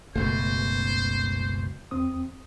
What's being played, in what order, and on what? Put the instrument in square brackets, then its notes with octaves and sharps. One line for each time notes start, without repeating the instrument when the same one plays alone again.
[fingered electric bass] F#1 C#2 B2 [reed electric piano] A3 [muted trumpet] C5
[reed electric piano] E2 C4 D#6